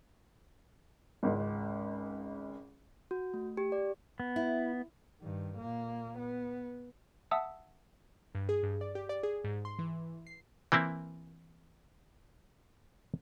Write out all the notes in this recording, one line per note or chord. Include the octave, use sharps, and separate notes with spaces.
G#1 C#2
F#4
A3
G4
D5
B3
E4
G2 D#3
A#2 A#3
B3
E5 F#5 A5 D#6 E6
G2
G#4
G2
D5
G4
D5
G#4
G#2
C6
E3
C7
E3 A#3 C4 E4